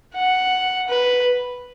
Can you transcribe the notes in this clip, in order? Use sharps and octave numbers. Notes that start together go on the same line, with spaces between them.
F#5
B4